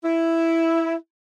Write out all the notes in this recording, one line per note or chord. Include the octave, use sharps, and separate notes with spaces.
E4